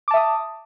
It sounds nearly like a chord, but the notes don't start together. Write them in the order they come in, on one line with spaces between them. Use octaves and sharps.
D6 A5 E5 D#6